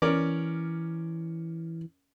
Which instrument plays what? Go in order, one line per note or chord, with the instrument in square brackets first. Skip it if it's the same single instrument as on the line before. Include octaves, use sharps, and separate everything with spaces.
[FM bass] E3 [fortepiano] C#4 A#4 D5